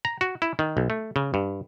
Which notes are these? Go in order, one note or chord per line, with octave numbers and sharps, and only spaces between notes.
A#5
F#4
E4
D#3
B1
A3
C#3
G2